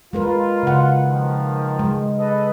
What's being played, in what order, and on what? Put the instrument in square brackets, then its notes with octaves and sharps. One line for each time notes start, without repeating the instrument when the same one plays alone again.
[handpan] G#3 A#4 B4 [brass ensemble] F4
[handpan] C#3 F#5
[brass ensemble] D#3 F3
[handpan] G#3
[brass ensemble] A4 B4 D#5